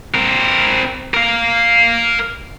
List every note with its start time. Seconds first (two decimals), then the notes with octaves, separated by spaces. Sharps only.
0.15 C4 A#4
1.14 A#4 F5